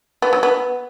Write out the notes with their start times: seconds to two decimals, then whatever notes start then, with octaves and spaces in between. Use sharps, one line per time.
0.22 B3
0.33 F#3
0.43 B3